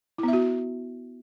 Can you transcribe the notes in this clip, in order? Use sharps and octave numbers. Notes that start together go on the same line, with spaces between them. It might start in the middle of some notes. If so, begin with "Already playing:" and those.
B3 E4 F#4 E5